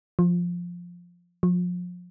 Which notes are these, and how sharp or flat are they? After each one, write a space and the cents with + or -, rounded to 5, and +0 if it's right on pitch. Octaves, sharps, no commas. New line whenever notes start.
F3 +5
F3 +35